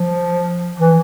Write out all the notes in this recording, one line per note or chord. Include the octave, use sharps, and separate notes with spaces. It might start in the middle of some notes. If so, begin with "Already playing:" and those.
Already playing: F3
E3